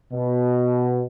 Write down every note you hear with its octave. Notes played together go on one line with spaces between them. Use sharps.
B2